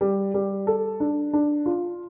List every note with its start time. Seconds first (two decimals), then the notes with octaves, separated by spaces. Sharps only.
0.01 G3
0.34 G3
0.67 A4
1.00 D4
1.33 D4
1.66 F4